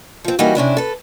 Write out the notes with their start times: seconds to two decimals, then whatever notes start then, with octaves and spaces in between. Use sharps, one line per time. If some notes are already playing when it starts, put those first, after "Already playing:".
0.24 F3 C4
0.39 E3 G3 A#3 D#4 F#4
0.55 C3 C#4 D4 E4
0.77 A4 B4